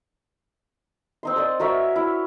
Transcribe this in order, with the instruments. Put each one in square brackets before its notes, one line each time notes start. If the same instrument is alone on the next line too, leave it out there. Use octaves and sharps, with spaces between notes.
[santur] C4 D#4 C6
A#4 D5 D#5
F#4 A#4 C#5 E5
E4